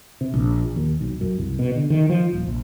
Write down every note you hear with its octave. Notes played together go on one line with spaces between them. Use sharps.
C3
A#1
D#2
B1
F#2
C2
B2
D3
D#3
F3
D#1
A#1